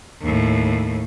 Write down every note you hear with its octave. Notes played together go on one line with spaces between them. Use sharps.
D#2 A2